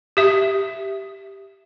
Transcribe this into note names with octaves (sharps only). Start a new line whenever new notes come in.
G4 E5